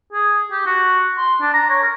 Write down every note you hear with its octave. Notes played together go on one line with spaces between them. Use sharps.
G#4
G4
F#4
C6
D4
A#5
C#5
A#4